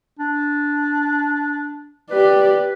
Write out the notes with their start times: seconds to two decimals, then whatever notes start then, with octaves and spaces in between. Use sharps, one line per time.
0.19 D4
2.10 G4 B4 D5